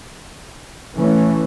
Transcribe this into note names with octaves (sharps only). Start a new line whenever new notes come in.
E3 A3 C#4